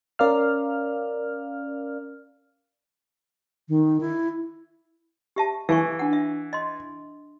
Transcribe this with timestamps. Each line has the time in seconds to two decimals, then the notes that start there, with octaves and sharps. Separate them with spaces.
0.19 C#4 A#4 D5 F5 F6
3.69 D#3
4.00 E4
5.36 G4 E5 A5
5.69 E3 F5 G#5 C#6
5.99 D4 F#5
6.13 E5
6.53 D#5 C6